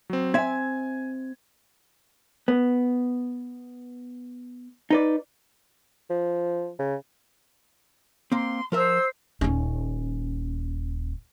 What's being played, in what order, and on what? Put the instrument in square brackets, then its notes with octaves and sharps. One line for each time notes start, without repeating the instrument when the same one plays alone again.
[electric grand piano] F#3 C4
[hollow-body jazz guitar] C4 E5 [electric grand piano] G#5 G#6
[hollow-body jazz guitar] B3
D#4 B4 D5
[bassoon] F3
C#3
[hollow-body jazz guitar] A#3 C4 [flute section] C6
[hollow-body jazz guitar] F3 A#4 E5 [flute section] C5 E6
[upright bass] D#1 C#4